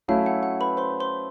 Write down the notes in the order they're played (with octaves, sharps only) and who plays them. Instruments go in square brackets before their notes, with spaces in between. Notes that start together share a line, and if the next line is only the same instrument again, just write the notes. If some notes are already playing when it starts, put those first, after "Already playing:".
[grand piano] F#3 A3 C#4 E4 [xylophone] F5
[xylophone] F#5
F#5
B4 B5
C5 C6
C5 C6